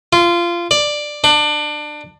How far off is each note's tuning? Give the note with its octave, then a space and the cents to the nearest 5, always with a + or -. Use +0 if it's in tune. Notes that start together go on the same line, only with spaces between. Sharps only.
F4 -20
D5 +10
D4 +25